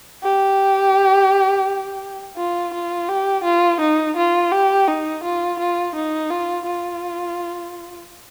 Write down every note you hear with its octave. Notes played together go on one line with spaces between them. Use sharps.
G4
F4
F4
G4
F4
D#4
F4
G4
D#4
F4
F4
D#4
F4
F4